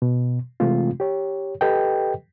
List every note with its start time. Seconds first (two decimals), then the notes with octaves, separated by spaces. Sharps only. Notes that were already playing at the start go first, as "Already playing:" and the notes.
0.02 B2
0.60 C3 E3 G#3 A3 C4 F4
1.00 G4 C#5
1.61 G4 A4 B4 D#5 G5